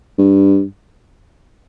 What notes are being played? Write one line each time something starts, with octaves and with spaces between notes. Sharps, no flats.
G2